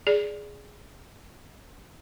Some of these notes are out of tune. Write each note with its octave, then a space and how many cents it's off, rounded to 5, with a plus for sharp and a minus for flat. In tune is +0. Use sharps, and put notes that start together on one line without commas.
G#4 +0 D5 -5